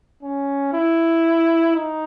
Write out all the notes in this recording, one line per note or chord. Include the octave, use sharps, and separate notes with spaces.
C#4
E4
D#4